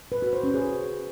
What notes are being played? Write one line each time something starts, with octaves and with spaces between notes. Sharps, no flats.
B4
F#4
C5
C#4
G#4